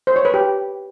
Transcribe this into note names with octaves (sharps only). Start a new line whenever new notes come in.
C5
C#5
B4
G4